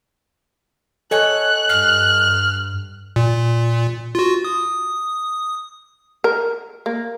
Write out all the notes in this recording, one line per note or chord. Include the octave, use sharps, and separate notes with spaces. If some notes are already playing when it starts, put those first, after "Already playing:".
A4 C#5 D#5 G#5 F#6
G2 F6
A#2
F4 F#4
D#6
A#4
A#3